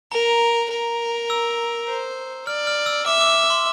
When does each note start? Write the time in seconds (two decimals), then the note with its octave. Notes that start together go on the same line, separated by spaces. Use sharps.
0.12 A#4 A#5
0.70 A#4
1.30 E6
1.88 C5
2.47 D5 F6
2.67 F6
2.86 E6
3.06 E5 D6
3.21 D6
3.50 C6